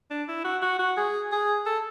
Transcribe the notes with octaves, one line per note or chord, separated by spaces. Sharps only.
D4
E4
F#4
F#4
F#4
G#4
G#4
A4